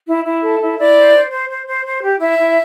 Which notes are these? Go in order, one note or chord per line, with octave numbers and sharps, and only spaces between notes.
E4
E4
A4
E4
E4 D5
C5
C5
C5
C5
C5
C5
G4
E4 E5
E4